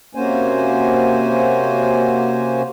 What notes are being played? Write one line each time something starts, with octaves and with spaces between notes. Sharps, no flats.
C3 A#3 C#4 F#4 C5 G#5